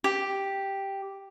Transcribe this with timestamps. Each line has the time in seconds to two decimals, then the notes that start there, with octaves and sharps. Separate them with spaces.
0.04 G4